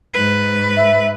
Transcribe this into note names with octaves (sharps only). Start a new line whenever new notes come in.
G#2 B4
E5